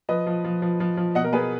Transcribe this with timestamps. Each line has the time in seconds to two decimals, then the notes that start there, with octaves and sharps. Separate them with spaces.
0.09 F3 B4 D#5
0.27 F3
0.44 F3
0.62 F3
0.80 F3
0.97 F3
1.15 B2 D#5 F#5
1.24 A#4
1.33 B3 G#4 B4